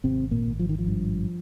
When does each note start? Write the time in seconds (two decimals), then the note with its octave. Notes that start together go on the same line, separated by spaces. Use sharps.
0.04 G#1 C3 C4
0.31 A#2 A#3
0.46 G#1
0.59 F3
0.69 D#3
0.79 F3
0.87 G2